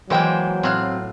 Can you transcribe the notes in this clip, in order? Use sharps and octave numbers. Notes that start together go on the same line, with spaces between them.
E3 F#3 G#3 A#3 C5 G5
A2 C4 F4 F6 F#6